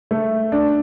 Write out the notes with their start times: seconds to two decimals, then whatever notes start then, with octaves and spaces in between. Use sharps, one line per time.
0.11 A3
0.52 D4